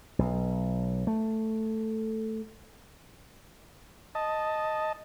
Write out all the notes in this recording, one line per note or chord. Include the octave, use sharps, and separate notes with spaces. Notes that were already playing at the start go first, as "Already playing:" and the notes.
B1
A3
D#5 A5